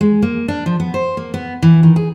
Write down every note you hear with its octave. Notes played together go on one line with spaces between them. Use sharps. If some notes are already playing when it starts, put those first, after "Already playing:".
G#3
A#3
D4
F3
B3
C5
A#3
B3
E3
D#3
G#4